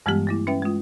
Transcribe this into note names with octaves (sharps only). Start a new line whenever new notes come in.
G2 E3 G3 G#3 B3 G4
A3 A#3 E4
C#4 B4 E5 G5
G#3 F4